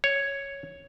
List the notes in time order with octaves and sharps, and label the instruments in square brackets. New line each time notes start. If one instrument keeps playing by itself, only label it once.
[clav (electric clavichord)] C#5